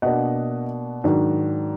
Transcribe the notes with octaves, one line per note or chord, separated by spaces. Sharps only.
B2 A#3 D4 D#5 F#5
G#2 D#3 F#3 D4